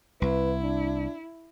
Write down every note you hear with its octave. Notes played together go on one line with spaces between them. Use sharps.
C2 E4 B4
D4